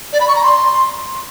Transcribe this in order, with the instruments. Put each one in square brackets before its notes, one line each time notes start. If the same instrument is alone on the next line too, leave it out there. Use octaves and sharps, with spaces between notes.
[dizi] D5
B5
C#6
A#5
C6